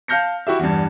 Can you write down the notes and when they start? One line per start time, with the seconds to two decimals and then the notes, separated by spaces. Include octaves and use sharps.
0.08 F5 A5 F6 G6 A#6 C#7
0.47 E4 F#4 G4 E5
0.59 E2 G2